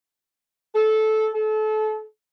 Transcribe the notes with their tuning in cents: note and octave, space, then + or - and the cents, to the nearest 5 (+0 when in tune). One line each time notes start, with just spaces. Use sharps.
A4 -15
A4 -30